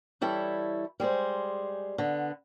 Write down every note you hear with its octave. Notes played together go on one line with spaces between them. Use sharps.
E3 G3 E4 A4 C#5
G3 G#3 G#4 C5
D3 B3